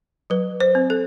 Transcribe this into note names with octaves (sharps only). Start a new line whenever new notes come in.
F#3 B4
C5
C4
A4